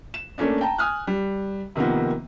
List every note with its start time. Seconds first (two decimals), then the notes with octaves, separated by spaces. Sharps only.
0.14 E7
0.38 A3 A#3 C#4 D4
0.61 G5 A5 A#5
0.78 G#5 D#6 F6 F#6
1.07 G3
1.75 C3 D#3 F3 A#3 B3